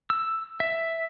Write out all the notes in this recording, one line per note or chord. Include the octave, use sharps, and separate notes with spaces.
E6
E5